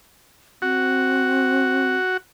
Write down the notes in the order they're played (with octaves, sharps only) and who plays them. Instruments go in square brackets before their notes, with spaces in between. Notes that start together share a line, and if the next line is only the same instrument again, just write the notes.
[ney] C4 [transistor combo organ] F#4